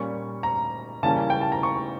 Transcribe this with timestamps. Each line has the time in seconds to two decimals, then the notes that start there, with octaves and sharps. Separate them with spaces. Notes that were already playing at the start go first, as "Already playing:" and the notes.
Already playing: A#2 G3 A#3 C#4 C#6
0.43 A#5
1.03 C#3 E3 G3 A#3 C#4 A5
1.30 G5
1.41 A5
1.52 A#5
1.63 C#6